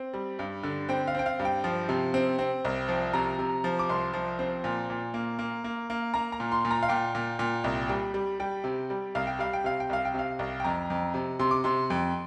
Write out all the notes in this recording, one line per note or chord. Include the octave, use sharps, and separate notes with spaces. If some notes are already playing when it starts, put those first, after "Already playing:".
Already playing: C4
G3
G2
D3
C4 G5
F5
C4 G5
F5
G2
G5
F3
C3
C4
C4
C2
F3
C3 A#5
C3
F3
D6
C2 C6
F3
C4
A#2
A#2
A#3
A#3
A#3
A#3
A#3 A#5
A#5
A#2
C6
A#2
A#5
F5
A#2 G5
A#2
A#2
C2
G3
G3
G3 G5
C3
G3
C2 F5
G5
G3 F5
G5
C3 F5
G5
C2 F5
G5
C3 F5
C2
G5
F2 A#5
F2
C3
C3 C6
D6
C3 C6
F2